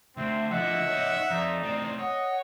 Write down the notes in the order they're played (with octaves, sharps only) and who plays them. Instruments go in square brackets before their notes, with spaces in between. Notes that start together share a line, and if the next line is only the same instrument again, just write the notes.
[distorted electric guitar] D2 [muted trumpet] C4 [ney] E5
[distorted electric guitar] D3 F3 [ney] D#5 [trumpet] E5 [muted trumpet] F#5
[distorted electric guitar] D#4 C#5
[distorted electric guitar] F2 [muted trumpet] D#4 [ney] D5
[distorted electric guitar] A2 C4
[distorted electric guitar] C#5 [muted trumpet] D#5 [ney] F#5